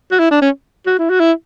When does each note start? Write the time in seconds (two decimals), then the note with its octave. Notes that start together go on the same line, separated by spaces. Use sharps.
0.12 F#4
0.19 E4
0.31 D4
0.42 C#4
0.86 F#4
0.99 E4
1.10 F#4
1.20 E4